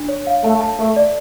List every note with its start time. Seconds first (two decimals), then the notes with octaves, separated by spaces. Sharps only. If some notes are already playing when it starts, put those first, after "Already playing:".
Already playing: D4
0.09 C#5
0.27 F5
0.44 A3 A5
0.61 A5
0.78 A3 A4
0.96 D5